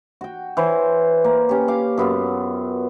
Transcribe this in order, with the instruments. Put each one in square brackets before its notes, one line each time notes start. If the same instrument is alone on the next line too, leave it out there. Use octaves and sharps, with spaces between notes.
[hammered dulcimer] F#4 G5
E3 C5 C#5
A#3
C#4 G4
F5 D6
F#2 B3 F4